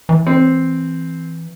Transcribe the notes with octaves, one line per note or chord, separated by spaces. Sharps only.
E3
C4